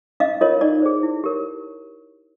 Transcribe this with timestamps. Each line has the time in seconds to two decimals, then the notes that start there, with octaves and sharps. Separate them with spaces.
0.20 C#4 D#5 F5
0.41 F4 A#4 C#5 D#5
0.61 D#4 D5
0.82 G#4 C5
1.03 E4
1.24 G4 A#4 C#5